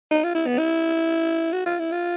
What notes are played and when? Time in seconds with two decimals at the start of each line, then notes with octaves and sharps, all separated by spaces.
0.11 D#4
0.24 F4
0.35 E4
0.47 B3
0.58 E4
1.53 F#4
1.66 F4
1.79 E4
1.91 F4